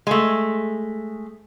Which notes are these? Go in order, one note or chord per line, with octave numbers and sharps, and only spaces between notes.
G#3 A3